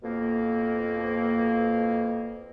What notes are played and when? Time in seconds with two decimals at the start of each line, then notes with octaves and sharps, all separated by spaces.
0.03 F2 B2 A#3